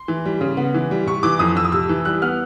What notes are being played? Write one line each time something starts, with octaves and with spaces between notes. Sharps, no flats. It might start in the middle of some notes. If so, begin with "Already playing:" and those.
Already playing: C6
E3
G3
C#3
B3
E3
G3
C3 C#6
E3 D6
F2 D#6
F2 E6
D#6
C3 E6
E3
G3 F#6
B3 F6